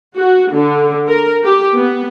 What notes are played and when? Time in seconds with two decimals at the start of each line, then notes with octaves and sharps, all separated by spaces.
0.18 F#4
0.53 D3
1.09 A#4
1.44 G4
1.76 B3